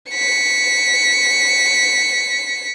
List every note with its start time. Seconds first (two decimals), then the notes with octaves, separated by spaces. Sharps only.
0.12 B6 C#7